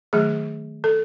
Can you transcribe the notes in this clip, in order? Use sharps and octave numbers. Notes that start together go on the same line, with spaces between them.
D#3 F#3 A3 G#4
A4